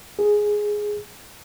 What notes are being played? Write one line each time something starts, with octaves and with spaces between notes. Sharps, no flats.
G#4